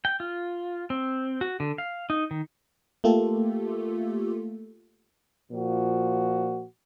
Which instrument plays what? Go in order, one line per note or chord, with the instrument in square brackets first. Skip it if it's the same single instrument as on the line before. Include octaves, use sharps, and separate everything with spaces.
[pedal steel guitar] G5
F4
C4
F#4
D3
F5
D#4
D#3
[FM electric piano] A3 A#3 F4 G4 A4
[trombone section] A#2 F3 F#4